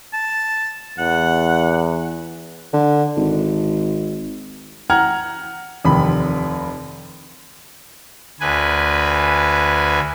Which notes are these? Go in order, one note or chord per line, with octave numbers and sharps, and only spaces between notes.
A5
E2 F#5
D3
G#1
F#5 A#5 F6 G#6
F1 D#2 C3 B5
D2 B4 G#5